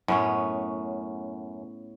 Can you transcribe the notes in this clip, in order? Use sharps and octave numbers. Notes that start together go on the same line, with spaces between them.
F#2 A2 B3 C#4